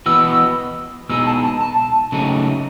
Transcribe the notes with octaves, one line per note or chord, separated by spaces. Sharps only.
E3 B3 F#4 B4 D#5 E6
B2 G#3 D#4 E6
A5
A5
A5
C#3 F#3 A3 D#4